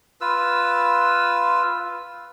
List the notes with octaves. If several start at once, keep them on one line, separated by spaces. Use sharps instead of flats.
F4 B4 E6